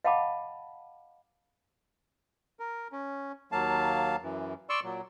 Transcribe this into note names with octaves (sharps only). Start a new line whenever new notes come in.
D#5 F5 F#5 A5 B5 D6
A#4
C#4
D#2 F#3 A#3 F5 A5
F#2 E3
D5 C6 C#6 E6
A#2 F#3